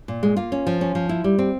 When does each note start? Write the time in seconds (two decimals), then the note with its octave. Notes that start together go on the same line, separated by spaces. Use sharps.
0.08 A#2
0.23 G#3
0.36 A#3 F4
0.52 C#4
0.67 F3
0.81 C#4
0.95 F3
1.09 E4
1.24 G3
1.39 C4